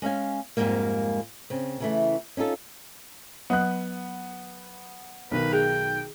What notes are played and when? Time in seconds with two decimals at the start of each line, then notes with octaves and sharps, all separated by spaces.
0.02 G#3 C#4 F5 G#5
0.57 F2 G#2 D3 G3 G#3 A#3
1.50 C#3 C4
1.80 C#3 E3 A3
2.37 C#4 D#4 F4 A4
3.50 F#3 B3 F#6
5.31 B1 D#3 B4
5.53 G#4 G5